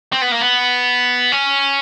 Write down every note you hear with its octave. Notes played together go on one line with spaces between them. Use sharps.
C4
B3
A#3
B3
C#4